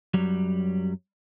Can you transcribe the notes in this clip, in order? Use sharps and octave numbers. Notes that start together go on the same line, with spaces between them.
F#2 F#3 G3